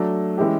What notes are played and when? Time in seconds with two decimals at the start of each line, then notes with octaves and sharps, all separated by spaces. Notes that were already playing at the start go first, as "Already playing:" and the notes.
Already playing: F#3 A3 D4
0.38 E3 G#3 C#4 E4 G4